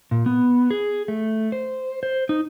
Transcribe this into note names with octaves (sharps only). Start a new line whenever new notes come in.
A#2
B3
G#4
A3
C5
C5
D#4